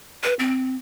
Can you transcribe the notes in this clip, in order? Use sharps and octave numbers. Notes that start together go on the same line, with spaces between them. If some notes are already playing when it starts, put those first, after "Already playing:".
B4
C4